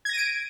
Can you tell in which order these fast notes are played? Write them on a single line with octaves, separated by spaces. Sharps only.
G#6 A#6 D#7 D7